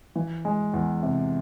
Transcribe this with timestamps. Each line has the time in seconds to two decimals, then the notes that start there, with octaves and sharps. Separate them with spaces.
0.16 E3
0.45 G#3
0.74 E2
1.03 C3